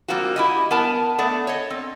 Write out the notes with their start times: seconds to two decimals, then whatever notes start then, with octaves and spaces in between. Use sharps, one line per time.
0.08 G3 A#3 C4 F4 F#4
0.36 E4 G4 D#5
0.71 B3 A#4 A5
1.18 A3 B3 D5
1.47 C#5 D#5
1.70 C4